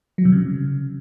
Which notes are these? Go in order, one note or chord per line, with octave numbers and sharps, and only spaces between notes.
F#3
C3
C#3